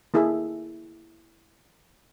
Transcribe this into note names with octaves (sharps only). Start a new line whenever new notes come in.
A#3 E4 G#4 A4 E5